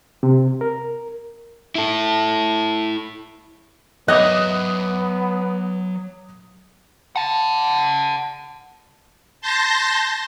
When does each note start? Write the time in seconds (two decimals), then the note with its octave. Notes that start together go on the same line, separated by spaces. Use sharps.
0.23 C3
0.61 A#4
1.75 E4 A4
4.08 F#3 B3 C#5 D#5 E5 D6 D#6 F#6
7.16 F#5 A5
9.41 A5 C6 G6 A#6